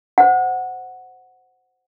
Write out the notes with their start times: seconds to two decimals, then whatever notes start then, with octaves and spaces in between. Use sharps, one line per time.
0.18 C5 F#5